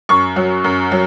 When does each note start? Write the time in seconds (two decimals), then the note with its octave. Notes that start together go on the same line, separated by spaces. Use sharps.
0.09 F#2 C#6
0.36 F#3
0.64 F#2
0.92 F#3